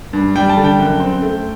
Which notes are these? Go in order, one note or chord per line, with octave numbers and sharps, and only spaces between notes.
G2
G3 G5
A5
D3
G5
F#2
C4
A3